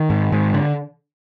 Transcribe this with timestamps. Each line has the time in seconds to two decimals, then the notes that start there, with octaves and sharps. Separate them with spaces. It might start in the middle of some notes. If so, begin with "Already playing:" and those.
Already playing: D#3
0.10 G#2
0.32 G#2
0.54 D3